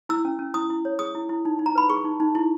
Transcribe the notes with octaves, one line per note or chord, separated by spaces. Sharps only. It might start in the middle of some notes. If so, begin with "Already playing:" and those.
E4 E6
C#4
C#4
E4 D#6
E4
C#5
G#4 D#6
E4
E4
D#4
D#4
A#5
B4 B5
G#4 C#6
D#4
D#4
E4